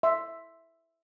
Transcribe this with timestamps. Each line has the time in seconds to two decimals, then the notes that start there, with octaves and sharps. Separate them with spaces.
0.03 E5 C6